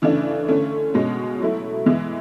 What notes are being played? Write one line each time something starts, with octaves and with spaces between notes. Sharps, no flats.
C#3 E3 A3 D4
D3 A3 C#4
B2 G#3 C#4
F#3 A3 E4
E3 G#3 B3 E4